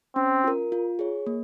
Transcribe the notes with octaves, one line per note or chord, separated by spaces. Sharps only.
C4 C#4
F4 A#4
F4
G#4 C#5
A#3